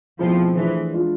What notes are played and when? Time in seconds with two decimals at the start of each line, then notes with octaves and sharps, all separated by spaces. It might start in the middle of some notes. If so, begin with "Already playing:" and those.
0.19 B2 F3 A3 C4 E4 G#4
0.55 E3 A3 D4 G#4 C5
0.91 G#3 D4 F4